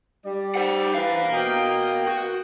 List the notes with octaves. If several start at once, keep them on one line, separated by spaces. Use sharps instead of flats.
G3 D5
C5 F#5
E3 D4 A#4 B4 F5
B2 D#5 G5
F#4